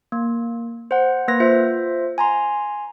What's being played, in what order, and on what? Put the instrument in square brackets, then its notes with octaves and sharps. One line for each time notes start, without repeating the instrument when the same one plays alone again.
[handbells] A#3
C5 F#5
A#3 B4 A#6
F4 C5 E5
G#5 A#5 C6